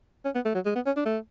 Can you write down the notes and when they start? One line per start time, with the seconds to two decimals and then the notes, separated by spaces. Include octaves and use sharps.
0.25 C#4
0.35 B3
0.45 A3
0.55 F#3
0.66 G#3
0.75 B3
0.86 C#4
0.96 D4
1.06 A3